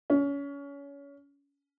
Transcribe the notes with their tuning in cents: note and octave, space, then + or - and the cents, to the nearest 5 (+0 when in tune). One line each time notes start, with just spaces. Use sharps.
C#4 +25